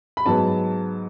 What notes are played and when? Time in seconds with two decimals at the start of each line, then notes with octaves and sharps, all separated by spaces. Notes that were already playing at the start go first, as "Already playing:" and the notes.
0.17 B5
0.26 G#2 F#3 B3 A5